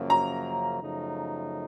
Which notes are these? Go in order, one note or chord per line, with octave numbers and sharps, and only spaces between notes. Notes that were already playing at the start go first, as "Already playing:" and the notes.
Already playing: F#2 C#3 F3 A#3
A#5
F#2 C#3 F3 A3 D#4